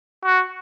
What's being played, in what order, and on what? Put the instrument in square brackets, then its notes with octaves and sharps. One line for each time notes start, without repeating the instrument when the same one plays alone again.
[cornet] F#4